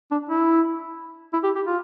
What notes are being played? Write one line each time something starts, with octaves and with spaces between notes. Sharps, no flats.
D4
E4
E4
G4
G4
F4